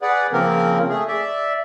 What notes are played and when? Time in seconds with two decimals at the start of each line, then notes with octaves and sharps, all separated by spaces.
0.02 G#4 B4 D5 F#5
0.33 C#3 F3 A#3 C4 A#4
0.90 A3 G#4
1.08 D5 E5